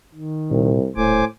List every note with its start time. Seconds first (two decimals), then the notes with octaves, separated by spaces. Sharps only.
0.14 D#3
0.51 C2 A#2
0.96 D#1 A2 C5 G#5 D6